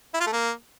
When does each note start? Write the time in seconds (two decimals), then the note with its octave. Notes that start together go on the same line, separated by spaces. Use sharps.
0.14 E4
0.20 F4
0.27 A3
0.33 A#3